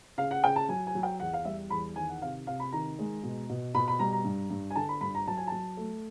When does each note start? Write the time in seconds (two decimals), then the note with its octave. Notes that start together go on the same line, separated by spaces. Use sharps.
0.18 C#3 F5
0.31 F#5
0.44 C#3 G5
0.56 A5
0.69 F#3 G#5
0.87 G#5
0.95 F#3
1.03 G5
1.20 E2 F#5
1.33 F5
1.45 G3 E5
1.70 E2 B5
1.96 D#3 G#5
2.09 F#5
2.22 C3 F5
2.47 C3 F5
2.60 B5
2.73 D#3 A#5
2.99 G#3
3.23 B2
3.50 B2
3.74 B2 B5
3.88 B5
3.99 G3 A#5
4.13 A#5
4.25 G2
4.50 G2
4.70 G#5
4.76 D3 A5
4.89 B5
5.01 G2 B5
5.15 A#5
5.27 F#3 A5
5.37 G#5
5.47 F#3 A5
5.77 A3